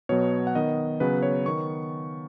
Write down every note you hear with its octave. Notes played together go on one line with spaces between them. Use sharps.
B2 F#3 B3 C#5
F#5
D#3 B3 D#5
C#3 F#3 B3 B4
C#5
D#3 B3 C#6